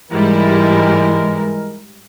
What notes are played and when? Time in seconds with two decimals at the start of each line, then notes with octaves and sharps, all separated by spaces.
0.11 G#2 E3 G3 G#3 E4 A#4